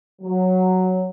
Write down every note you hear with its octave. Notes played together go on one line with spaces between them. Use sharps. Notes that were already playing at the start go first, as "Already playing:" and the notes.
F#3